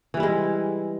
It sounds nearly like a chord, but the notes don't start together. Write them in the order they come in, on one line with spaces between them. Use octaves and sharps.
E3 G3 E4 G#3